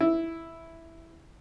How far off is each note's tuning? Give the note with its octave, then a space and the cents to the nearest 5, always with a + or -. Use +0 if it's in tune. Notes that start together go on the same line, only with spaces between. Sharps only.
E4 +0